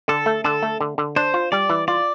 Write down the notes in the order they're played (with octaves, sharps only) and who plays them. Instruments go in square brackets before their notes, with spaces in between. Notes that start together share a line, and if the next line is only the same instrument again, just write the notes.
[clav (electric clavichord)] D3 [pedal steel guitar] A4
[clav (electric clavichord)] A3
[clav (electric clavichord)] D3 [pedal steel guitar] A4
[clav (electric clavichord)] A3
D3
D3
[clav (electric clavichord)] D4 [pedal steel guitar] C5
[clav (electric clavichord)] F4
[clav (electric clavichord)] G3 [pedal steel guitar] D5
[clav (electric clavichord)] E3
[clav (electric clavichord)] F4 [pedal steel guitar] D5